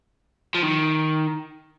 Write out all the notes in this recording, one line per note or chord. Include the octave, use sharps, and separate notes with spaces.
F3
D#3